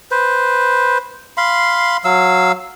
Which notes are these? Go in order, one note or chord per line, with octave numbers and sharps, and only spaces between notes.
B4 C5
F5 B5 C6
F#3 F5 E6